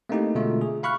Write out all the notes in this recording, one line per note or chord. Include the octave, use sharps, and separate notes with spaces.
A3 A#3 C4 D#4 E4 G4
B2 D3 G#3 A3 F4
G#4
F5 B5 C#6 F6 F#6